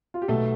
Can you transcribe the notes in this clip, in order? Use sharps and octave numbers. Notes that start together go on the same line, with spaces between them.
F4
G4
B1 B2 A3 A4